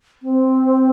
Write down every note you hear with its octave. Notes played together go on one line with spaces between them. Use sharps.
C4